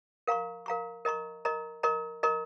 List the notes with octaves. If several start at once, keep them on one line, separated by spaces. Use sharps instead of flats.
A#4 F5 A#5 C#6
A#4 F5 A#5 C#6
A#4 D#5 A#5 C#6
A#4 D#5 A#5 C#6
A#4 D#5 A#5 C#6
A#4 D#5 A#5 C#6